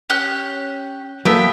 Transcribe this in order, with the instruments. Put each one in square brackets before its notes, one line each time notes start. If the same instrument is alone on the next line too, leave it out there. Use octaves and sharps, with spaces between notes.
[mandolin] C#4 G4 F#6
[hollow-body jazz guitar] F#3 A#3 A4 [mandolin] B3 E5 G5